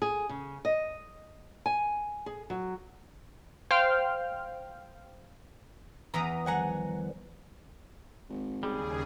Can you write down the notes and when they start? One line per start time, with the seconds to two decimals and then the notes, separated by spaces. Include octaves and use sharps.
0.02 G#4
0.29 C#3
0.65 D#5
1.66 G#5
2.26 G#4
2.50 F#3
3.71 C5 F5 G5 F6
6.14 E2 E3 A#5 D#6
6.46 D#3 F3 G3 G#4 F#5 G#5 A#5
8.29 G#1
8.63 D#2 C#3 G3 G#3 G#4